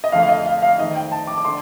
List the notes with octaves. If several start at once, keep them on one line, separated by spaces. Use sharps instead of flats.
D#5
F2 D3 A3 F5
F5
D#5
F5
F5
D#3 A3 C4 D#4 D#5
G5
A5
D6
D6
D3 C6